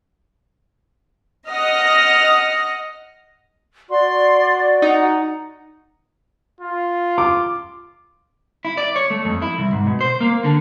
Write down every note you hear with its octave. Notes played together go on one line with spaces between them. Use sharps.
D#5 F#5 D#6 F6 A#6
F#4 D5 C6
D#4 F#5
F4
D6
E4
D5
C#5
A3
F2
E4
C2
G#2
B2
C5
A#3
D3